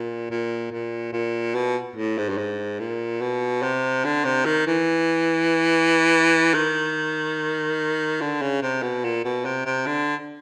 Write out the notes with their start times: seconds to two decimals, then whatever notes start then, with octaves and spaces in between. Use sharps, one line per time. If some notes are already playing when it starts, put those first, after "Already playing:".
Already playing: A#2
0.31 A#2
0.71 A#2
1.13 A#2
1.55 B2
1.96 A2
2.18 G#2
2.29 G2
2.37 G#2
2.79 A#2
3.21 B2
3.62 C3
4.05 D3
4.25 C3
4.46 D#3
4.67 E3
6.54 D#3
8.21 D3
8.41 C#3
8.62 C3
8.82 B2
9.04 A#2
9.25 B2
9.45 C3
9.66 C3
9.86 D3